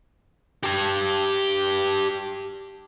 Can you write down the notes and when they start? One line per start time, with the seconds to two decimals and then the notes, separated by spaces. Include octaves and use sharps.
0.63 G4 A5